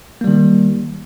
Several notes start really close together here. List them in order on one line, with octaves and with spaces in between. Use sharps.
A#3 G3 D#3